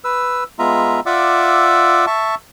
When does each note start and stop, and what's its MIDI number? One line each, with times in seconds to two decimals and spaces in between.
0.04 0.44 71
0.04 0.44 88
0.59 1.00 56
0.59 1.00 59
0.59 1.00 65
0.59 1.00 76
0.59 1.00 82
1.06 2.05 65
1.06 2.05 74
1.06 2.05 76
1.06 2.05 78
1.06 2.05 86
1.06 2.05 88
2.07 2.35 76
2.07 2.35 81
2.07 2.35 85